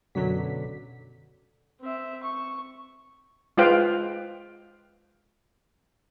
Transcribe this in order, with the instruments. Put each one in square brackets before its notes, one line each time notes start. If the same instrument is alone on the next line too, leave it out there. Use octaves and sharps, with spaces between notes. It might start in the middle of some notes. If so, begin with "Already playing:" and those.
[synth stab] F#2 F#3 B6 [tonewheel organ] B2 D3
[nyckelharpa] C4 E5
C#6
[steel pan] G#3 F4 B4 C5 F5 G5